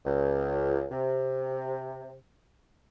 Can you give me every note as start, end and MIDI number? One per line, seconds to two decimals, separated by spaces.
0.05 0.84 37
0.91 2.14 48